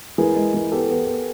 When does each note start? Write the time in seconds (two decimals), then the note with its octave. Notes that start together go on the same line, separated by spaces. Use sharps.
0.18 E3 G#4 A#4
0.36 G#3
0.54 E3
0.72 B3 G4 A4
0.89 B3
1.07 B3